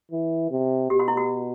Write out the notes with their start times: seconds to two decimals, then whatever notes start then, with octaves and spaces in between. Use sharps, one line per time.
0.11 E3
0.51 C3
0.90 B2 G4
0.99 F#4
1.08 E4
1.17 F#4